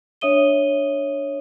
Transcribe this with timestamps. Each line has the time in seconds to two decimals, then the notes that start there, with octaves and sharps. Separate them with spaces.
0.21 D4 C#5 E5 D#6 D#7 G7